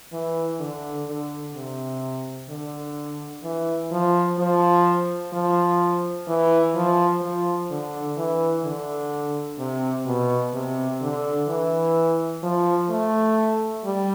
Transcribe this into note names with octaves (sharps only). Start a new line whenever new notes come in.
E3
D3
D3
C3
D3
E3
F3
F3
F3
E3
F3
F3
D3
E3
D3
C3
B2
C3
D3
E3
F3
A3
G3